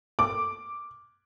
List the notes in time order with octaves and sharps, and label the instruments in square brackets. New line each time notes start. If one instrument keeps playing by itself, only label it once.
[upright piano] D6